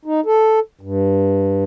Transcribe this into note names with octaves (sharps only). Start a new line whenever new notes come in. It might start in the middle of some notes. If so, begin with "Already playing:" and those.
D#4
A4
G2